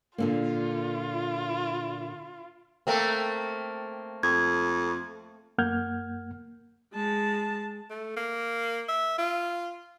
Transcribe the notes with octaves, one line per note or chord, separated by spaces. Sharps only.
A#2 D3 A#3 F4
A3 A#3 C4
F2 G#6
F#2 A#3 F#5 F6 G6 G#6
G#3 A5
A3
A#3
E5
F4